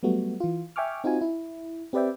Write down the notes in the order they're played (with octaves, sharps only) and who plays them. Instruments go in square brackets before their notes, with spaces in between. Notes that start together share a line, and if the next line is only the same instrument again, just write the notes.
[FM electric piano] F#3 G3 A3 B3 F#4
E3 F4
E5 G5 G#5 C#6 D6 F6
C4 D#4 F4 F#4 G#5
E4
C4 G4 B4 D5 E5 G5